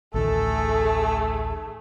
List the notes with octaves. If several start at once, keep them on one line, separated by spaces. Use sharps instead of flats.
A1 D2 D#3 A3 G#4 A4